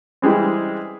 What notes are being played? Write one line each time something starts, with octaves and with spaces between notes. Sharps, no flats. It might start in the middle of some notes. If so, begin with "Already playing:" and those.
E3 G3 G#3 C4